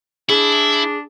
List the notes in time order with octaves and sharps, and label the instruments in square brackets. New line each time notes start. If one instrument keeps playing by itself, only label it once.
[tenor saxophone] D4 [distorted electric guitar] E4 [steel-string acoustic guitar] G#4